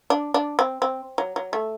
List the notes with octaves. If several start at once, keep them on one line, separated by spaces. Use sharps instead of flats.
D4
D4
C4
C4
F#3
F#3
A3